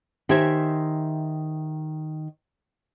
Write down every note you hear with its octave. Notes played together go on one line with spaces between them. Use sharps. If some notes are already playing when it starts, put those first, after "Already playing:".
D#3 G4 C5 E5 G#5